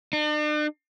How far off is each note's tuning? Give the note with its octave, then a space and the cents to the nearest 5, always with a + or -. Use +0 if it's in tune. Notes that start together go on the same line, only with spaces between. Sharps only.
D4 +45